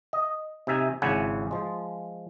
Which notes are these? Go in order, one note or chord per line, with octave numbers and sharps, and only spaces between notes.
D#5
C3 D#4 E5 G#5
G#1 C#3 E4 F#5 G#5
F3 G#3